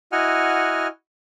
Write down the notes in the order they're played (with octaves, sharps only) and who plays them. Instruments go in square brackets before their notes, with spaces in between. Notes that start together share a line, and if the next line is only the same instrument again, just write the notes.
[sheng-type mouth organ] E4 F#4 D#5 F#5 G#5 F6